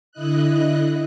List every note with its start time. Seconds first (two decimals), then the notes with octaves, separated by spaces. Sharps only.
0.12 D3 E4 D#5 F#6